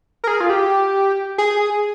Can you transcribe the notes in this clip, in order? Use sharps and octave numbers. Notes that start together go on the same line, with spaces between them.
A#4
G#4
F4
G4
G#4